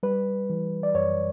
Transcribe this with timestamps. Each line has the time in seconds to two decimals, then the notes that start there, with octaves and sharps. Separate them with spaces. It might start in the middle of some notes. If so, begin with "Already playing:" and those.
0.03 G3 B4
0.50 E3
0.83 D5
0.95 F#2 C#5